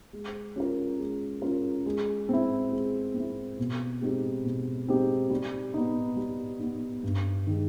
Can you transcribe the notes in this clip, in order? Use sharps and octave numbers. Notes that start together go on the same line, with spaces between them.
G#3
C#4 F4 A#4
G#3
C#4 F4 A#4
G#3
C4 E4
G#3
C4
E4
B2
G#3 C4 D#4 G4
B2
G#3 C4 D#4 G4
G3
B3 D#4
G3
B3 D#4
G2
D#3 G#3